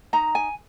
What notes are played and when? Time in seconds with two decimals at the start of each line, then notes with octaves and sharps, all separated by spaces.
0.13 D#4 A#5
0.35 G#5